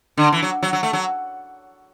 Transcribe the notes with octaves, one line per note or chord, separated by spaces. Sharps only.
D3
E3
F#3
F#3
F#3
A3
F#3